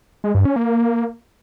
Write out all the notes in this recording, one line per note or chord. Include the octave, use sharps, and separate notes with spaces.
G#3
G2
C#4
A#3